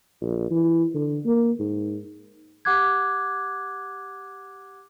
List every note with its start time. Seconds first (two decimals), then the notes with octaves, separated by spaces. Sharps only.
0.21 A#1
0.50 E3
0.95 D3
1.25 A#3
1.59 G#2
2.65 G4 F#5 D6 F#6 G#6